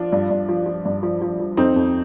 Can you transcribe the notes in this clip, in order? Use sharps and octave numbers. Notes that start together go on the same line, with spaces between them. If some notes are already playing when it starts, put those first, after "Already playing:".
Already playing: F3 D4 F4
G2
G2
F3
F3
G2
F3
F3
F3
F2 C4 D#4
F2